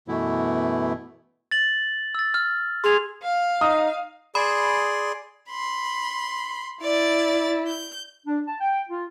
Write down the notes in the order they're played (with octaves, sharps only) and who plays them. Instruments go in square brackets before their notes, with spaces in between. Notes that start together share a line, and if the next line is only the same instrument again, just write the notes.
[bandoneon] F#2 B2 E3 A3 B3 E4
[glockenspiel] A6 F#7
E6 A6
F6
[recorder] G#4 [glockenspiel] C6 F7
[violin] F5
[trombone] D#4 [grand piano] D#6
[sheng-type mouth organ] G#4 D5 C6 [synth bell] B5 D#6
[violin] B5 C6
[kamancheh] E4 [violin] D5 A6
[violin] G6
[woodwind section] D4
A5
G5
F4